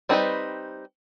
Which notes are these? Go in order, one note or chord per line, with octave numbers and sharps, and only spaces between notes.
G3 C4 D#4 G#4 B4